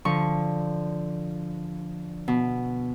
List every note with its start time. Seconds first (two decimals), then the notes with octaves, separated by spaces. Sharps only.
0.05 D3 F3 C#6
2.28 B2